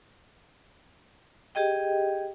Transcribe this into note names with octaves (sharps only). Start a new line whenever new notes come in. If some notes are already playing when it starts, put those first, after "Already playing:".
G4 G#4 D#5 G5